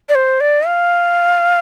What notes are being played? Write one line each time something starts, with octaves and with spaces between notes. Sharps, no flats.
D5
C5
D5
F5